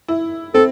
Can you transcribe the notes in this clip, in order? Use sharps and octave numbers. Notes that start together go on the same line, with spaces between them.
E4
C4 A4